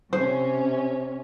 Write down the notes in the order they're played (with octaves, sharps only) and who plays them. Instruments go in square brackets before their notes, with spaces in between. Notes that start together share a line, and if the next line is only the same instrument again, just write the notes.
[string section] C3 C#4 [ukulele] C5